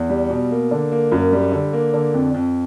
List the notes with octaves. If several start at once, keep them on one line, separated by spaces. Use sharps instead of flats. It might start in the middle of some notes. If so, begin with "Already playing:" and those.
Already playing: E2
G3
B2
A#3
D3
A#3
F#2
G3
D3
A#3
D3
F2
F2